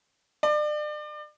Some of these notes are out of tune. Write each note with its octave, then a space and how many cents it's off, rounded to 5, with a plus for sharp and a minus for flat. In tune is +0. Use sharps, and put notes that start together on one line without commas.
D5 +35